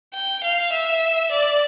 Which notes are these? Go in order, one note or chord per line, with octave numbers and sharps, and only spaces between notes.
G5
F5
E5
D5